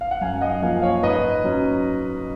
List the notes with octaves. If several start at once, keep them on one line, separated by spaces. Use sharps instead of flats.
F5
F#5
F#2 F5 G#5
D#5 F#5
F3 A#3 F5 G#5
C#5 F5
G#2 B4 D#5
F#3 C#4